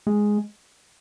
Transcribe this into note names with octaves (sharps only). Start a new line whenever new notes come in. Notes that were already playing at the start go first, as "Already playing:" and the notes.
G#3